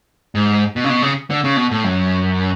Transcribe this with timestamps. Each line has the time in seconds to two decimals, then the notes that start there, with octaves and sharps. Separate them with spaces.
0.35 G#2
0.76 B2
0.84 C#3
0.89 B2
1.02 C#3
1.30 D3
1.44 C#3
1.57 B2
1.71 A2
1.84 F#2